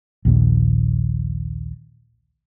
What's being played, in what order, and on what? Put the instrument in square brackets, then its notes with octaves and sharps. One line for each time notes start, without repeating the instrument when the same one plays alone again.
[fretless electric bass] A#1 D#2 A#2